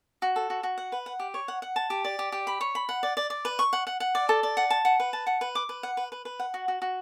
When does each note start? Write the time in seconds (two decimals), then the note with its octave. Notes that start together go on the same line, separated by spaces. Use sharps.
0.22 F#4
0.36 A4
0.50 F#4
0.63 F#4
0.78 F#5
0.92 B4
1.06 F#5
1.20 G4
1.34 C#5
1.48 F#5
1.62 F#5
1.76 A5
1.90 G4
2.05 D5
2.19 G4
2.32 G4
2.47 B5
2.61 C#5
2.75 B5
2.89 F#5
3.03 D5
3.17 D5
3.30 D5
3.45 B4
3.59 C#6
3.73 F#5
3.87 F#5
4.00 F#5
4.15 D5
4.29 A4
4.43 D5
4.57 F#5
4.70 A5
4.85 F#5
5.00 B4
5.13 A5
5.27 F#5
5.41 B4
5.55 D6
5.69 B4
5.83 F#5
5.97 B4
6.12 B4
6.25 B4
6.39 F#5
6.54 F#4
6.68 F#4
6.82 F#4